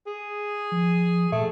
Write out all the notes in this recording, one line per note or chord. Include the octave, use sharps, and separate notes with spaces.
G#4
F3
A#2 A3